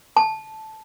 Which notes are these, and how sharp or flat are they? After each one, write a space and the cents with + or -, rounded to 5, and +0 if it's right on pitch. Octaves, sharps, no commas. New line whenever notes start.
A5 -10